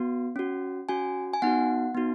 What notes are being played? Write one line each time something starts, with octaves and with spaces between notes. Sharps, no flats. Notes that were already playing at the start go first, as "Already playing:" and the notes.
Already playing: B3 F#4
C#4 F#4
C#4 F#4 G#5
G#5
B3 D#4 F#4 F#5
B3 D#4 F#4